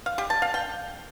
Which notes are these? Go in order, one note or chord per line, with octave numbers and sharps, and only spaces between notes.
F5
G4
A5
F5
G5